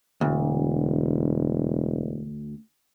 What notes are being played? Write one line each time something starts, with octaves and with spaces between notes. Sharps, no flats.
E1 D2